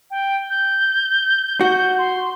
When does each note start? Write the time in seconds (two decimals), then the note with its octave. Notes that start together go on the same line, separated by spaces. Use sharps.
0.11 G5
0.50 G6
1.61 F#4
1.98 C6